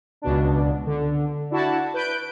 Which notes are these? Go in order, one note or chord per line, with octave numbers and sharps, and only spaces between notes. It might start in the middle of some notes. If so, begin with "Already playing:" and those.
C#2 B2 D4
D3
D4 E4 F#4 A5
B4 G6 D7